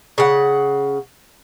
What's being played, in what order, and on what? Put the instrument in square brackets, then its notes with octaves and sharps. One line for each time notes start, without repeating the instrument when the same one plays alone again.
[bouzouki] C#3 F#5